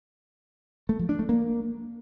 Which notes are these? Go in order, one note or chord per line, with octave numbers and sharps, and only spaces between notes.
A3
F3
D4
A3
A#3